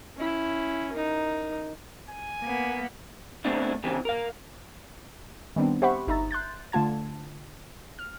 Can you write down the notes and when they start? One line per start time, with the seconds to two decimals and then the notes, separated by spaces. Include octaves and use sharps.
0.17 C#4 E4
0.93 D#4 A#4
2.10 G#5
2.41 A#3 B3
3.45 A3 B3 C4 D4 E4
3.84 C#3 E3 C4 G4
4.05 A#4 F5
5.56 D#3 G3 B3 C4 D4
5.82 G4 C5 E5 F#5 B5 C#6
6.07 G1 D#4 E5 A#5 A6
6.31 C6 F#6 G6 A6
6.72 D3 A3 F4 A5 G#6
7.99 F6